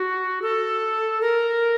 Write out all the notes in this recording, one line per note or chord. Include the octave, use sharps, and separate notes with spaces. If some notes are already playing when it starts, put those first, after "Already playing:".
Already playing: F#4
A4
A#4